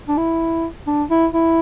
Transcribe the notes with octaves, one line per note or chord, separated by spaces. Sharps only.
D4
E4
D4
E4
E4